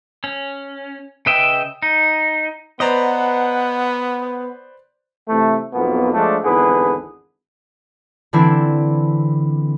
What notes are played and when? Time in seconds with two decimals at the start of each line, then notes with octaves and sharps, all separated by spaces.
0.24 C#4
1.26 C#3 B4 D#5 E5 G5
1.82 D#4
2.80 B3 B4 C5 D5 D#5 F#5 A#5
5.29 C3 E3 A3
5.73 B1 F2 B2 A#3 B3
6.14 F3 G#3 A3 D4
6.44 G#1 E2 D3 G#4 B4
8.33 D3 E3 C4 D4 E4